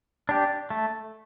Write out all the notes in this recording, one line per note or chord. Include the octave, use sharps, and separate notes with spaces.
D4 G4
A3